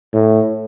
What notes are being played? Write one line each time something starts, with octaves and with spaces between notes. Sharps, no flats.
A2